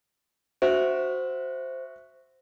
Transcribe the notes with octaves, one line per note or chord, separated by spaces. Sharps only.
F#4 C5 E5